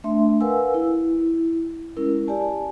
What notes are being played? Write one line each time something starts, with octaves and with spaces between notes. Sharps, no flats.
A3 D4 E5 C6
A#4 B4 F5 F#5 G#5 E6
E4
G#3 C#4 E4 A#4
G4 D5 G#5 A5